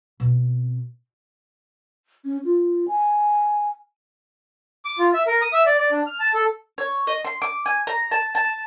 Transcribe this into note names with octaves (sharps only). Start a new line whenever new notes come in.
B2 C4
C#4
F4
G#5
D6
F4
E5
A#4
D#6
E5
D5
D5
D4
F6
A5
A4
C#5
D#5
C6
D6
G#5
A#5
A5
A5